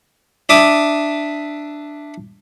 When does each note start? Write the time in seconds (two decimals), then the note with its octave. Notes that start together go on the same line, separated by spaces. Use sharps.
0.49 D4 E5 D6 D#6